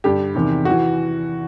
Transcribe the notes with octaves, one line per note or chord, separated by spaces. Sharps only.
G2 D3 G4
E2 C3 D#3
F#4
E3